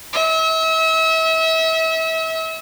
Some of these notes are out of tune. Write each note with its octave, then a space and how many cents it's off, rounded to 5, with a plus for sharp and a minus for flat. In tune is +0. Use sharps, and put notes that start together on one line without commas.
E5 -35